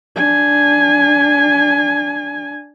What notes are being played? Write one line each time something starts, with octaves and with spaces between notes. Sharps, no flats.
D4 G#5